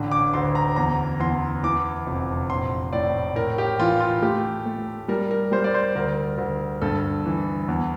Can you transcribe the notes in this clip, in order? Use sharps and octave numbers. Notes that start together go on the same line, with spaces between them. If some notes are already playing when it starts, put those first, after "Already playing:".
Already playing: A1 D3
D6
D2 C6
A#5
E2 A#5
E2 C6
E3 D6
F1
A#1 C6
A2 D5
A2 A#4
G4
E3 F4
F4
A3 G4
A3
G3 A#4
A#4
G3 C5
D5
C5
D2 A#4
D2
G2 A4
E3
E2